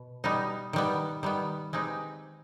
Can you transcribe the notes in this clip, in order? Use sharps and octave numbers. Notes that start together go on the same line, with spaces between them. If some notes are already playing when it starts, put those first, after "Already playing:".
Already playing: B2
B2 G3 B3 D#4
D#3 G3 B3
D#3 G3 B3
G#3 C4 D#4 G4 B4